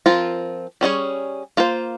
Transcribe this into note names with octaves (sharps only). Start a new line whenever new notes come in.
F3 C4 F4 A#4
G3 C#4 F4 G#4 C#5
A#3 F4 C5